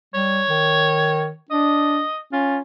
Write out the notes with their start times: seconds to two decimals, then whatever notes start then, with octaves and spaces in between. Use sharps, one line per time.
0.14 G3 C#5
0.49 D#3
1.51 D4 D#5
2.33 C#4 F4